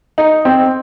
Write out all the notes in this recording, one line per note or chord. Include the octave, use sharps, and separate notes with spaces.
D#4
C4